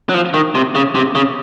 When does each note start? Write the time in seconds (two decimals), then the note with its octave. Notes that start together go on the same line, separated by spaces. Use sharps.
0.09 F#3
0.14 F3
0.34 D#3
0.55 C3
0.75 C#3
0.95 C3
1.15 C#3